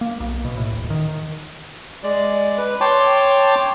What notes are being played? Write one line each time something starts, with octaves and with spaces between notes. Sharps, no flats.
A#3
B1
B2
A2
D#1
D#3
G#3 D5
B4
C#5 G5 A5 C6 D6